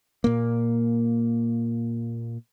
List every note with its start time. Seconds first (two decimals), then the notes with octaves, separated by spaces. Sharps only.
0.24 A#2 A#3